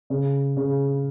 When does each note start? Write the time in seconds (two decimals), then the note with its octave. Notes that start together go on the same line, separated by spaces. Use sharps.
0.10 C#3
0.57 C#3